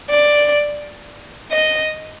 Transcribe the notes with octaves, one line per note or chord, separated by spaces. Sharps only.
D5
D#5